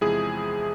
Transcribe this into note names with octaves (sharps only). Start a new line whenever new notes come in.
E2 C3 F3 G#3 E4 G#4